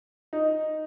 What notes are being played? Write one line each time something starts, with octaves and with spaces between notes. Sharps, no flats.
D#4